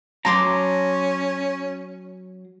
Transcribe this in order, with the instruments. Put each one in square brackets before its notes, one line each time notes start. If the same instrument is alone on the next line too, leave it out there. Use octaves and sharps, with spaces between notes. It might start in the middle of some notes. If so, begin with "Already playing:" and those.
[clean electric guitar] F#3 A#5 [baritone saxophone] C#4 [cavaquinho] A5 C6 D6